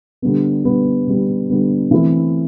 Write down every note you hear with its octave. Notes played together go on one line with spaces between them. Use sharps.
D3 G3 B3
D3 G3 B3
D3 G3 B3
D3 G3 B3
E3 A3 C4 E4